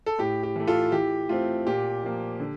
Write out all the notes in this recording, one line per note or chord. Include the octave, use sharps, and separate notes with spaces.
A4
A2 G4
G4
E3 A3
F4 A4
E3 G4
A3 C4 F4
A#2 G4
F3 A#3
D3